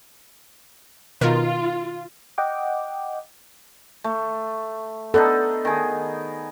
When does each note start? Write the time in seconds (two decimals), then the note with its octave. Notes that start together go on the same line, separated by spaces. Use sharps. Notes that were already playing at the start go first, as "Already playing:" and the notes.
1.21 B2 D#3 F4 A#4
2.38 D#5 F#5 G5 D6
4.04 A3
5.14 B3 D4 D#4 A4
5.65 D#3 G#4